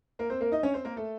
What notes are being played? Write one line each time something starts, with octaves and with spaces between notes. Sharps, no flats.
A#3 A#4
C4 C5
A#3 A#4
D#4 D#5
C#4 C#5
C4 C5
A#3 A#4
A3 A4